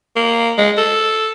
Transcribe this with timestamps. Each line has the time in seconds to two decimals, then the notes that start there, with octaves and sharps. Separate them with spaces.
0.16 A#3
0.58 G#3
0.77 A4